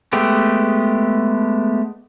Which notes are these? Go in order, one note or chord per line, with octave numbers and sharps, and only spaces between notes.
G#3 A3 B3 G4